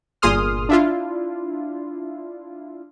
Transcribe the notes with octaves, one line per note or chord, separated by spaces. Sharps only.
G1 A#2 G#4 C6 D#6 F6
D4 E4 F4